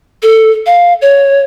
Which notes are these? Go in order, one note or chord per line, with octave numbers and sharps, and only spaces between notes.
A4
F5
C#5